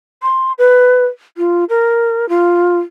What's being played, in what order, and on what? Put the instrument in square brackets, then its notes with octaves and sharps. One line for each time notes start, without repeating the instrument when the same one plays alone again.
[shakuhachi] C6
B4
F4
A#4
F4